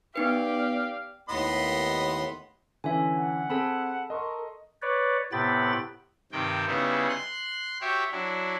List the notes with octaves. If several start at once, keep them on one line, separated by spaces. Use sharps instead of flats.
B3 D#4 G4 B4 D5 F5
D#2 A2 B3 D#5 C6
D3 E3 C#4 E5 G#5
F#5
C4 G#4 A4 A5 B5
A#4 D#5 C6 C#6
B4 C#5 D5
A2 C3 B3 G5 B5 A6
G2 C3 D#3 G5
C#3 G3 B3 D#4 E4 G#4
C6 F#6
F#4 G4 C#5 E5 G5
F#3 D4 E4